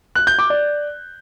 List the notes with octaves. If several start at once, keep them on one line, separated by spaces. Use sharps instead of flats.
F#6
G6
D6
D5